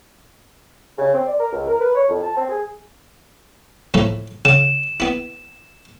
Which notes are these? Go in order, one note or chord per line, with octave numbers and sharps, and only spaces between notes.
C#3
C4
D5
A#4
C#2
A#4
B4
C#5
F2
A5
C4
G#4
A2 F3 A3
C#3 E7
B3 E4